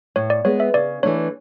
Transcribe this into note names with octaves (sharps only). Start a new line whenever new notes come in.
A2 C#5
D5
G#3 B3 C#5
E5
C#3 D5
E3 A3 D4 C#5